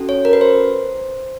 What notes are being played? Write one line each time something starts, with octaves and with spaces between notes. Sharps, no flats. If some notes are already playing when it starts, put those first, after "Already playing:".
Already playing: C#4 F#4 A4
C#5
A#4
B4
C5